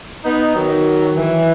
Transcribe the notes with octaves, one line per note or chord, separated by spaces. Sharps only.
B3 D#4
D#3 F#3
E3